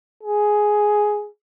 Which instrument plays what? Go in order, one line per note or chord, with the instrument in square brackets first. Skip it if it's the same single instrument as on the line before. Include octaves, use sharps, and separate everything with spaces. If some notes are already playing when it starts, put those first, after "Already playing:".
[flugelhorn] G#4